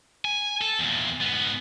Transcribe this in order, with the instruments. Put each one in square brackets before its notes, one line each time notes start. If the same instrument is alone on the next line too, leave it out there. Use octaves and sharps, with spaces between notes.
[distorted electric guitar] G#5
A4
E2 A#2
G#2 B3